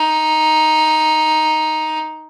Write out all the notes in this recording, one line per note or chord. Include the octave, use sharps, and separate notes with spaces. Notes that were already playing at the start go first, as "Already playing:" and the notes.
Already playing: D#4